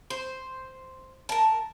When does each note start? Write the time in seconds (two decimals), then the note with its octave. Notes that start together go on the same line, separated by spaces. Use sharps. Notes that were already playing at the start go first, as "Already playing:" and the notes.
0.10 C5
1.29 A#4 A5